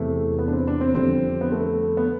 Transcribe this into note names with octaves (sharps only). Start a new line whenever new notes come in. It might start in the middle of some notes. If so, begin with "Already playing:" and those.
Already playing: E2 C3 E3 A3
B3
D4
C4
D4
C4
F2 D3 G3 C4
B3
A3
B3